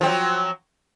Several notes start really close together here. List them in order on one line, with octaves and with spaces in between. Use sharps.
F3 C4 F#3